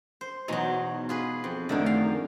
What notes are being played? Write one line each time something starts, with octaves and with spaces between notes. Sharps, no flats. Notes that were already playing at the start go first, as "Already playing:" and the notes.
C5
E2 B2 F#3 D#4
F4 G#4 B4
F2
F#2 D3 D#3 A3
F5